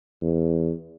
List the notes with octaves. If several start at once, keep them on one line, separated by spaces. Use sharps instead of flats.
E2